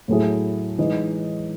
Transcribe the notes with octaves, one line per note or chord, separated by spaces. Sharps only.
A2 F#3 A3 E4 G#4
E3 G#3 D#4